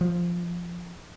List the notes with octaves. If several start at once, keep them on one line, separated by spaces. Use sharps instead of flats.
F3